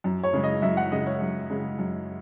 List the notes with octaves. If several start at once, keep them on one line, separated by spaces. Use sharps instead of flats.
F#2
C#5
C#3 G#3
D#5
F#2 E5
F#5
C#3 G#3 D#5
C#5
F#2
C#3 G#3
F#2